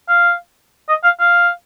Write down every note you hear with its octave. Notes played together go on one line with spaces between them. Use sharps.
F5
D#5
F5
F5